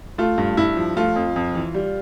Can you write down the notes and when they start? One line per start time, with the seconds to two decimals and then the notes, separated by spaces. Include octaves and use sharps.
0.18 A3 F4
0.38 G2
0.57 G2 E4
0.77 F3
0.97 A3 F4
1.16 F2
1.36 F2
1.55 E3
1.75 G3